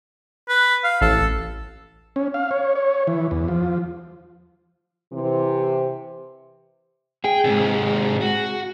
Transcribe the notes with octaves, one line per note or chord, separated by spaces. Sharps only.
B4
F5
A1 A4
C#4
F5
C#5
C#5
E3
E2
F3
C3 E3
G#4 G5
G#2 C3
F#4